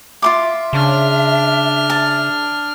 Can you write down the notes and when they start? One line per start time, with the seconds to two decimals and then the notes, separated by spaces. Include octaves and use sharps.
0.22 F4 E5 C6 D6
0.73 C#3 D4 F6
1.90 A5